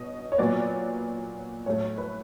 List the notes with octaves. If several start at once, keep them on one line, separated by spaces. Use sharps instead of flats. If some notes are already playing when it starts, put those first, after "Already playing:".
Already playing: B2 D#5
C#5
A#2 F#3 B3 D5
A2 F#3 A3 C#5
B4